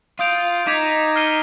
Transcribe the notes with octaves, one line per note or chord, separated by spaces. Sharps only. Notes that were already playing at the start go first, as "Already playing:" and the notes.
F4 D#6 G6 D7 F7
D#4 D6 G#6 B6 F7
F6 C7 D#7 G7